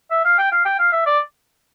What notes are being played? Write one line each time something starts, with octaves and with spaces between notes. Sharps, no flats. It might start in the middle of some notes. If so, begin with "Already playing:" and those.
E5
F5
G5
F5
G5
F5
E5
D5